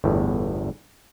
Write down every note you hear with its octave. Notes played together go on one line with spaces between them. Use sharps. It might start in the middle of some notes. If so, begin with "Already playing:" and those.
G1 E2 A2